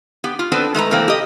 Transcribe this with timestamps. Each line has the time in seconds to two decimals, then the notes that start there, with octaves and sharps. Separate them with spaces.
0.24 B3 G4
0.39 F4
0.52 B3 C4 D4 A4 B4
0.74 G#3 A3 B4 A#5
0.91 C3 E3 A3 A#3 C4
1.08 G4 D#5